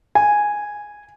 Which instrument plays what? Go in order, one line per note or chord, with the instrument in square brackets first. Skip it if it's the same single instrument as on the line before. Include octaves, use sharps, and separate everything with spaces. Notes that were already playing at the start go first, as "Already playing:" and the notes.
[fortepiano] G#5